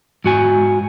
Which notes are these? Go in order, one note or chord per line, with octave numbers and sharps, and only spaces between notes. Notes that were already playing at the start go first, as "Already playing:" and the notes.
G#2 F#4 G#5